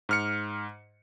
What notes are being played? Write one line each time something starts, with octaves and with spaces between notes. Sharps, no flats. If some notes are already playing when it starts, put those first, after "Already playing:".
G#2 F6 C#7